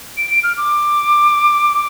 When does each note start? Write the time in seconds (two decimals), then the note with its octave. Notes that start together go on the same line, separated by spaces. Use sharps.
0.17 D7
0.31 D7
0.44 F6
0.57 D6